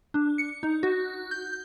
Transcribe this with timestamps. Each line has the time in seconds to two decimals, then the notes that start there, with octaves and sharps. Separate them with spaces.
0.14 D4
0.38 C#7
0.63 D#4
0.83 F#4
1.31 G6